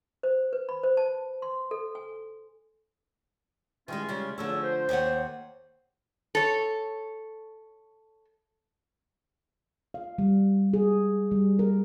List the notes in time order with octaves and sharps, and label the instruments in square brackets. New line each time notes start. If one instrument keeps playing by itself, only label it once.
[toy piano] C5
B4
B5
C5
A5
C6
A4
G#5
[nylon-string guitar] D#3 G3 G#3 [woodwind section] E3 C#4 F4
[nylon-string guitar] C#3 G3 G#3
[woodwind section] E2 C#5 E6 [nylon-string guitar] D3 F3 A3
[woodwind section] C5
[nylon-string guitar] D#2 C#5 F#5
[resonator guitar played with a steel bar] A4 C#5
[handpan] F5
G3
G#4
G3
A#4